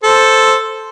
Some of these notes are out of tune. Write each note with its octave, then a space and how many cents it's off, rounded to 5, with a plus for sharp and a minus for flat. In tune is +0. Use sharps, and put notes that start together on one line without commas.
A4 +0 C5 +0